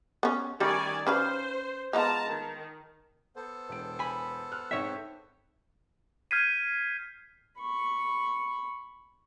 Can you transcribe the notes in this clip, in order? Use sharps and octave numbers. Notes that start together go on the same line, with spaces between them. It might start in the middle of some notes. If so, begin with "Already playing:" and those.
B3 C#4
D#3 G3 A3 C#4 D5 G#5
C#4 B4 C5 F5
G#3 B3 F4 A5 A#5
D#3
B3 A4 C5
E1 D7
G#5 B5
F6 F#6
G#2 C4 C#5 E5
F6 G6 G#6 B6 C7 D#7
B5 C#6